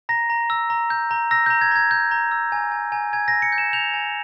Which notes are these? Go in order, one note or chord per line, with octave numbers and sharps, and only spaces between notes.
A#5 A#6
A#5
E6
A#5
G6
A#5
E6 A#6
A#5 G6
G#6
A#5 G#6
G6
A#5
E6
G#5
G#5
G#5
G#5 G#6
A#6
E6
C#7
G6
E7
G6 F7
G#5